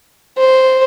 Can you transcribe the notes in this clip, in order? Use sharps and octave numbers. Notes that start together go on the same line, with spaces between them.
C5